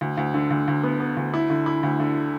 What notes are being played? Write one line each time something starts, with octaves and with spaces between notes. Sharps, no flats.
D2
D2
D3
D2
D2
B3
B3
D2
E4
D3
E4
D2
D3